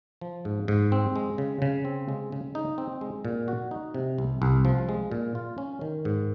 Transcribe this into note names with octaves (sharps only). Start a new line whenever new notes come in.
F3
G#2
G#2
C4
G#3
C#3
C#3
C4
G#3
C#3
D#4
C4
G#3
A#2
F#4
D#4
C3
C2
C2
F3
G#3
A#2
F4
C#4
D#3
G#2